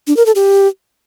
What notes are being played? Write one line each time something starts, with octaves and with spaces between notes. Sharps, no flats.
D4
A#4
A4
G4